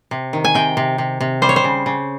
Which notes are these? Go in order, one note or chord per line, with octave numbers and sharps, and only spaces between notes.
C3
D#3
G#5
C3 G5
C3
C3
C3
G3 C5
C#5
C5
C#3
C#3